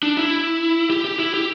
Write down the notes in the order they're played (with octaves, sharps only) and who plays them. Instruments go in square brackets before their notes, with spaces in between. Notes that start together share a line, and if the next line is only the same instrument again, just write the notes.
[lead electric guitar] D4
E4
G4
G4
E4
G4